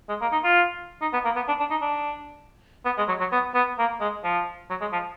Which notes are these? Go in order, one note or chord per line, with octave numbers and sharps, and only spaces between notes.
G#3
A#3
D#4
F4
D#4
B3
A#3
B3
D4
D4
D#4
D4
B3
G#3
F#3
F#3
B3
B3
A#3
G#3
F3
F#3
G#3
F3